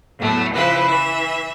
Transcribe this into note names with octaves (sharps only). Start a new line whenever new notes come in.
E2 A2 F#3 A3
C#3 F3 E4 B4 C5
E3 E5